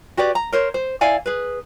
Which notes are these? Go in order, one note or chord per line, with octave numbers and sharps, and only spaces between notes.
F#4 G4 B4 D5
A#5
A#4 C5 C#5
C5
E4 D5 F5 G#5
G#4 B4